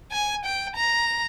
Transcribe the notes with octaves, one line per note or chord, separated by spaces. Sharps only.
G#5
G5
A#5